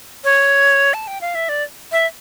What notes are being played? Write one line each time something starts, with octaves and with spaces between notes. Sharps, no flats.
C#5
A5
G5
F5
E5
D5
E5